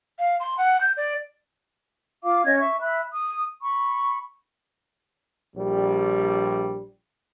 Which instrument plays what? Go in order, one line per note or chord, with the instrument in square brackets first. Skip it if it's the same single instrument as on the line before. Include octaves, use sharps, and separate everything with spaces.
[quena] F5
C6
F#5
G6
D5
[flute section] F4 F5 D6
C#4 C#5 D#5 G#6
E5 C#6
E5 B5 F#6
D#6
B5 C#6
[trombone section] A#1 G3